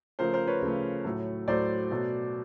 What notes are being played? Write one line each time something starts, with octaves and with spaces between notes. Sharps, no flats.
C#3 F3 A3 A#4 C5
A#4 C5
B4 C#5
C#3 F3 A3
A2 F#3 A3
A2 F#3 A3 C5 D5
B2 F#3 A3